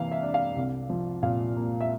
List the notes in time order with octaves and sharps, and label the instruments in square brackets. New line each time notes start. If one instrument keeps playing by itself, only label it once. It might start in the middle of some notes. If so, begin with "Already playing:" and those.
Already playing: [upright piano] C3 E3 A#3 F5
E5
D4
F5
C2
F3
A#2 F5
A#3
E5